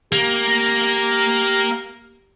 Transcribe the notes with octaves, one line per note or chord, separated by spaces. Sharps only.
A#3 G4